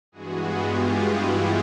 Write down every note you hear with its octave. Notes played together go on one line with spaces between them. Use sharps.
G2 E3 G#3 B3 F#4 G#4
F4 G4
E4 F#4
F4 G4